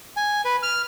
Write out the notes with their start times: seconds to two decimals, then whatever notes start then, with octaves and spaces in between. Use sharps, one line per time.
0.16 G#5
0.45 B4
0.63 F6